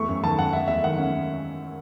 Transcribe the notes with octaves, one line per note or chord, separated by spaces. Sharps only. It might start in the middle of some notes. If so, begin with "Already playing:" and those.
Already playing: E2 A3 C#6
F#2
D#3 A5
F#2 F#5
A3 E5
E2 E5
D#3 F#5
C#4